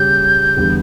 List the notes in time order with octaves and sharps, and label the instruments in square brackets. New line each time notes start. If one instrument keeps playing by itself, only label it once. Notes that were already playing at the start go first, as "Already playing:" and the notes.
Already playing: [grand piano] C#3 G3 C#4 G4 [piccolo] G6
[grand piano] E2 D3 G3